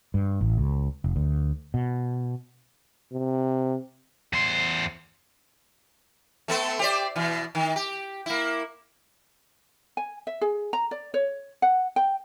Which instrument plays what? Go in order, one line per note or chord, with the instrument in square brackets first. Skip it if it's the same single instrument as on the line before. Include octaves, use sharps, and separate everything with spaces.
[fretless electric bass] G2
A1
C#2
F1
D2
B2
[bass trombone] C3
[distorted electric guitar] E2 C5
[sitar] A3 B3 A4
G4 C5 D5
B2 E3
D#3
G4
A#3 E4
[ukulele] G#5
E5
G#4
A#5
D5
C#5
F#5
G5